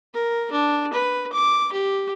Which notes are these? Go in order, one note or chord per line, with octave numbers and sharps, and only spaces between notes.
A#4
D4
B4
D6
G4